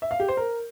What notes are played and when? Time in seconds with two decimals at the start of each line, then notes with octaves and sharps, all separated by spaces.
0.02 E5
0.11 F5
0.20 G4
0.28 C5
0.37 A#4